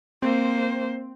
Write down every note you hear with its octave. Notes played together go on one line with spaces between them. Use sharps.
A#3 C4 C5